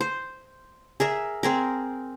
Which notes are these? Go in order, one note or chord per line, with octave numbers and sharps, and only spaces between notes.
C5
G#4 A#4 E5
C4 G#4 A#4